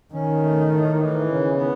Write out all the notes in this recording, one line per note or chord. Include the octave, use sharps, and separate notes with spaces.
D#3 C#4
A3
A2
E3
C#3
B3